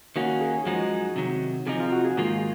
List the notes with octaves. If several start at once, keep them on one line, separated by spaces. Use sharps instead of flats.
D#3 A#3 C#4 F#4
G#4
F#2 F3 G#3 D#4 F#4
C3 D#3 F#3
C3 F3 C4 D#4 G#4
F4
F#4
G#4
G#2 D#3 A#3 F4